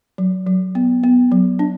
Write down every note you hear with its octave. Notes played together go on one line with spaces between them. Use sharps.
F#3
F#3
B3
B3
F#3
D4